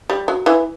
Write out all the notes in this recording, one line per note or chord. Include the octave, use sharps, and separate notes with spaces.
G3
F#3
E3